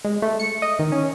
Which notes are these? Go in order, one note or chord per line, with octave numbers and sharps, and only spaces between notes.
G#3
A3
C#7
D#5
D#3
C#4